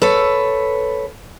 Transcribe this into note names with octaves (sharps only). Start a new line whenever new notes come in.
A4 B4 C#5